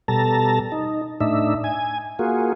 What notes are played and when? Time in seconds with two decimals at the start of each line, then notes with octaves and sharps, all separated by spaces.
0.08 B2 G3 A4 A5 A#5
0.72 D#4
1.20 A2 D4 D#4 E5
1.64 G#5
2.19 A#3 F4 F#4 G#4